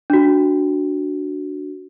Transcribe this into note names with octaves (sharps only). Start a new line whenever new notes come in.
D4 F#4